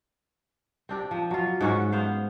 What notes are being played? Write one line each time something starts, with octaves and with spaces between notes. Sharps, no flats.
C4 D4 G4
F3
F#3 F4
G#2 C#4 F#4
B3 C5 F5